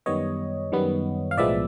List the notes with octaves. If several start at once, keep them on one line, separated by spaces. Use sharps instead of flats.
F#2 D#3 G3 B3 C#5 D#5
F#2 D#3 G3 B3
F5
B1 A2 F3 G#3 B3 D5 E5